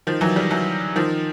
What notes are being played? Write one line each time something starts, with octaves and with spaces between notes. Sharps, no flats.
D#3 F3
E3 F#3
F3 G3
E3 F#3
D#3 F3